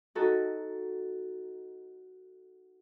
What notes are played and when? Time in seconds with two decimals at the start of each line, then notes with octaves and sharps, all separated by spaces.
0.15 D#4 F#4 A4